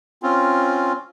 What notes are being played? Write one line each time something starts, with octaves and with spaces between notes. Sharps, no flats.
C4 C#4 F4